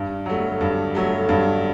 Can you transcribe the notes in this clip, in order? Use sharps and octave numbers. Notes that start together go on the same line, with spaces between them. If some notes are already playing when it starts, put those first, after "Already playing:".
Already playing: G2
F#3 A3
G2
F#3 A3
G2